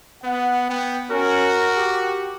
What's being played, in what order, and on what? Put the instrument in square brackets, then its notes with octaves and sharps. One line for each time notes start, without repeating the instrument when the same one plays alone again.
[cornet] B3 [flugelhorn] F#5
[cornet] B3 [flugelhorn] G5
[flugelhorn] C#4 [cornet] F#4 [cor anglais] A#4
[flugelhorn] G4